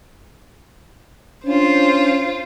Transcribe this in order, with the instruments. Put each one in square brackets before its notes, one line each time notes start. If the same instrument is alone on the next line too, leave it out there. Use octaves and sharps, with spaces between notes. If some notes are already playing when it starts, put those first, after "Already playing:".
[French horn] C#4 [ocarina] D4 [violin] F4 C5